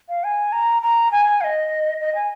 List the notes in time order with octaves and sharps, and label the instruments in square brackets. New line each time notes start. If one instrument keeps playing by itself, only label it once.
[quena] F5
G#5
A#5
A#5
G#5
F5
D#5
D#5
G#5